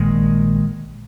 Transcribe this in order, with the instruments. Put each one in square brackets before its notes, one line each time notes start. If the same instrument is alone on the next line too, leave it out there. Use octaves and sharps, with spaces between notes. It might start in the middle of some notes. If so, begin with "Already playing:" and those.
Already playing: [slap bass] A#1 A#2 D#3 G#3